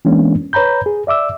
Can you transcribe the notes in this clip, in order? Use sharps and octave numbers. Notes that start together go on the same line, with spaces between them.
E3 G#3 A#3 B3 C#4 D4
B4 C#5 A#5 B5 G6
G#4
D5 E5 D6 E6